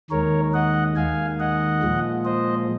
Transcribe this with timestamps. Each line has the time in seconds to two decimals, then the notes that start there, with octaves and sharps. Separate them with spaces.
0.10 D#2 D#3 G#3 A#4 C#5
0.54 D#5 F#5
0.96 D#2 D#3 G#3 F5 G#5
1.39 D#5 F#5
1.82 A#2 F3 G#3
2.25 C5 D#5